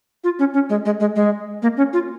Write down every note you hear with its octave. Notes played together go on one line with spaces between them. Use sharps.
F4
C#4
C#4
G#3
G#3
G#3
G#3
A#3
C#4
F4